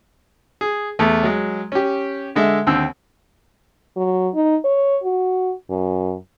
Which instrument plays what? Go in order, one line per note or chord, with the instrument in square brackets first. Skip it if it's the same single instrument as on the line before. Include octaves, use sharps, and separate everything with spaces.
[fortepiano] G#4
E2 A3
F#3 G#3
C#4 G4
D3 G#3 A4 E5
D#2 D3 C4 E6
[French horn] F#3
D#4
C#5
F#4
F#2